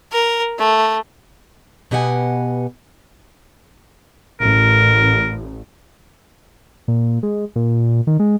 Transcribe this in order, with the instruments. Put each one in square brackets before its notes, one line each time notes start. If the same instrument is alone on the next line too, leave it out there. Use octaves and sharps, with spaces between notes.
[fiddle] A#4
A3
[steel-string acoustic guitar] B2 B3 G4 D#5 F#5 G#5
[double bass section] A1 [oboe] A#4
[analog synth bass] A#2
G#3
A#2
D#3
G#3